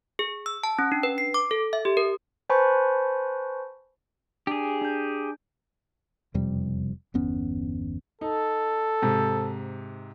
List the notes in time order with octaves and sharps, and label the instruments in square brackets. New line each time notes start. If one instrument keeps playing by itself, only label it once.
[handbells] G#4
E6
A5
C#4
D4
B4
C7
D6
A4
E5
G4
A#4
B4 C5 G#5 A5 B5 C#6
[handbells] D4 [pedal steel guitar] G4 G#4
[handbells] D4 G6
[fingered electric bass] E1 F2 C3 G3
G1 E2 B3 C#4
[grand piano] D#4 [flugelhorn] A4
[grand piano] G#2 C3